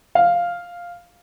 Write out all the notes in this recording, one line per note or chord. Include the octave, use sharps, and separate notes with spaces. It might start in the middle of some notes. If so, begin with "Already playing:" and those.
F5